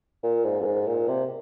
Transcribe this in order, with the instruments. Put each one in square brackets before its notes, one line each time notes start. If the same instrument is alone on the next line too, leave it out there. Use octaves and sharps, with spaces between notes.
[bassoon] A#2
G#2
F2
G#2
A#2
C3